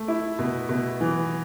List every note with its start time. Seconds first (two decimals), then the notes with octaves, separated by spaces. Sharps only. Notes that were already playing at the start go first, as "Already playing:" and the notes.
Already playing: A3
0.08 E4
0.39 B2
0.69 B2
1.01 E3